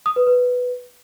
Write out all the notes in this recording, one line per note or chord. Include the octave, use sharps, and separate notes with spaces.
D#6
B4
B4